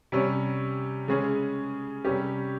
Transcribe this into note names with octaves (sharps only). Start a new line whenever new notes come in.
C3 G3 C#4
C#3 G#3 C#4 G#4
C3 G3 C#4 G4